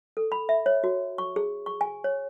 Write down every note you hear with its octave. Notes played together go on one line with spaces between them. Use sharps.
A4
B5
E5
C#5
F#4
C#6
G#4
C#6
G#5
C#5